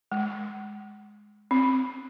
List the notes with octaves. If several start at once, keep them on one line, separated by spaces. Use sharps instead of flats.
G#3
C4